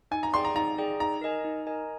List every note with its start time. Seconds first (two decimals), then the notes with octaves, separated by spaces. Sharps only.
0.11 D#4 G#5
0.23 A#5
0.34 G#4 D5 G5 C6
0.45 A#5
0.56 D#4 A#5
0.78 G#4 D5 G5
1.00 D#4 A#5
1.22 A#4 D#5 G#5
1.44 D#4
1.67 A#4 D#5 G#5